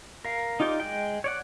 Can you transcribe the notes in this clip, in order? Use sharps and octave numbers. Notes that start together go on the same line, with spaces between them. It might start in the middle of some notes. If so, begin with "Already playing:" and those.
A#4 F5
D#4 F4 G4 D5
G#3 G5
C#5 D5 F#5